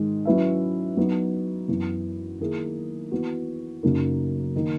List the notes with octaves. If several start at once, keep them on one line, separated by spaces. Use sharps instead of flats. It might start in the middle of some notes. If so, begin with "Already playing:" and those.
Already playing: G#2 D#3 G#3
F#3 C#4 E4 B4 E5
F#3 B3 D#4
F#2 E3 B3
D#3 A#3 E4 G#4
E3 B3 F#4
F#2 C#3 F#3 A#3 D#4
D#3 A#3